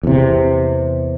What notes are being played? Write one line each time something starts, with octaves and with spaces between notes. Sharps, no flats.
E2 C3